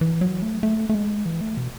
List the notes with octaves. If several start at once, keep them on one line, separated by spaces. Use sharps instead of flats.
E3
F#3
A3
A3
A3
G#3
E3
A3
B2